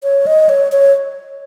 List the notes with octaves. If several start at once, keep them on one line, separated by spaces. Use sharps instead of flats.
C#5
D#5
C#5
C#5